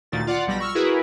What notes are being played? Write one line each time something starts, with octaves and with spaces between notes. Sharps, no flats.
D2 A#2 D#3 A6
F4 D5 F#5
B1 G3 B5 A#6
C#6 E6 F6
E4 F#4 G#4 A#4 B4